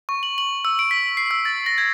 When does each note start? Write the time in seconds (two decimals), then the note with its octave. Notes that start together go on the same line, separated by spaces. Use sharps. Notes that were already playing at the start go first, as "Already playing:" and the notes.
0.09 C#6
0.23 F#7
0.38 F#7
0.65 E6
0.79 D7
0.91 B6
1.17 C7
1.31 E6
1.45 A6
1.66 A#6
1.78 G#6